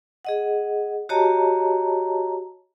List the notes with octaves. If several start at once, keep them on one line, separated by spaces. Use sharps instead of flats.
G#4 D#5 F#5
F#4 G4 C#5 D#5 A5 A#5